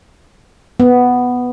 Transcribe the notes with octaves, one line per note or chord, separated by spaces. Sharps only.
B3